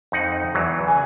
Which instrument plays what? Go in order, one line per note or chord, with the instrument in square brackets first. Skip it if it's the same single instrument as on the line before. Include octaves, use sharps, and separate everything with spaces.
[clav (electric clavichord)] F2 D#4 F#5
E2 E3 F#3
[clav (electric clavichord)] C#3 [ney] G#5